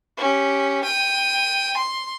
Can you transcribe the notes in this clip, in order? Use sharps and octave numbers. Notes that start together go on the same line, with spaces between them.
C#4 G4
G5 D#7
C6